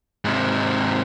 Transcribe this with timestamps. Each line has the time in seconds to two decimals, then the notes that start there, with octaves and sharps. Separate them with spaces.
0.25 G#2 C3